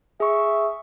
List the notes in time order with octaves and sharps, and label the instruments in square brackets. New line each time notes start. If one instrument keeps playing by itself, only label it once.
[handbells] G#4 C#6 [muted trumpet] E5